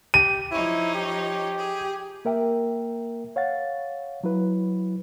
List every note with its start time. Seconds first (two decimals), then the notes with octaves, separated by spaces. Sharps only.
0.14 G4 D#7
0.52 F3 D#4 E4 C#5
0.94 G4
1.57 G#4
2.25 A#3 A#4 E5 G5
3.36 C#5 F5 F#5 A6
4.24 F#3 E4 B4